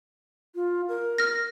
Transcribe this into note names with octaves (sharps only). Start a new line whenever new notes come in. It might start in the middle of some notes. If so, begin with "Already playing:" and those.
F4
A#4
F6 A#6